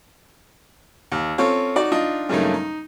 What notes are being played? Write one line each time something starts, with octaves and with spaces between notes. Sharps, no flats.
D#2
C4 C#4 F4 A4 C#5 F5
D#4 F#4 D5
D4 D#4 F4 D#5
G2 C#3 F#3 A3 A#3 D#4
D#4